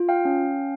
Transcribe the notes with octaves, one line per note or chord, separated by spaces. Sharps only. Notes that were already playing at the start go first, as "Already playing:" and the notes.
Already playing: F4
F5 G5
C#4